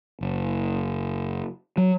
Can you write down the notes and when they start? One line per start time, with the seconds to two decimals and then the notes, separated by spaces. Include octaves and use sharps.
0.21 F#1
1.78 F#3